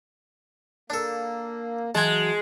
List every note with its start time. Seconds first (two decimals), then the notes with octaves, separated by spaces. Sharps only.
0.90 A#3 D4 A4
1.95 E3 F#3 G#3 F#4 G#5 A5